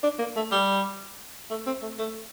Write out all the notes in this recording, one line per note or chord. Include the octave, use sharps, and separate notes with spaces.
D4
A#3
A3
G3
A3
C4
A3
A3